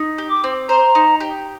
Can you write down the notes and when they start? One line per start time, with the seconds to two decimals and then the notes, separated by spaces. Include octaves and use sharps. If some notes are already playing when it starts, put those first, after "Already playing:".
Already playing: D#4
0.18 G4
0.30 D6
0.44 C4
0.69 C5 A#5
0.95 D#4
1.20 G4